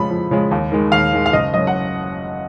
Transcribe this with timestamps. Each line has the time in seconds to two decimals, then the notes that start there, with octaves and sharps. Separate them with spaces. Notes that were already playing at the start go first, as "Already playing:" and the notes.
Already playing: F2 C#3 F3 G#3 B5
0.10 F2
0.31 C#3 F3 G#3
0.51 D#2
0.72 D#3 G#3
0.92 D#2 F5
1.13 D#3 G#3
1.26 F5
1.33 F#1 D#5
1.54 F#2 C#3 D#5
1.67 F#5